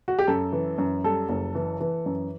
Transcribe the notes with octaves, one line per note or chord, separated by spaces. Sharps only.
F#4
G4
F#2 A4
E3
F#2
G3 A4
F#1
E3
E3
F#2